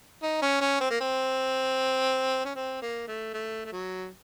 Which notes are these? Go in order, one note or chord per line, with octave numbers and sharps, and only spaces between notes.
D#4
C#4
C#4
C4
A#3
C4
C#4
C4
A#3
A3
A3
A3
F#3